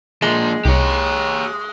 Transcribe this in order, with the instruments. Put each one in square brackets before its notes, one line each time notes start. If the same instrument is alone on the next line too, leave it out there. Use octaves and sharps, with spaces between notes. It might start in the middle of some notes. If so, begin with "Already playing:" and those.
[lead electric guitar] F3 A#3 [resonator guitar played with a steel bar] G#3
[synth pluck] C2 [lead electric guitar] G4 C#5